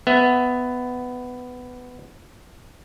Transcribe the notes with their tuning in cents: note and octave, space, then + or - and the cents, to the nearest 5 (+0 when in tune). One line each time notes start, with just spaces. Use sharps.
B3 +10 E5 +0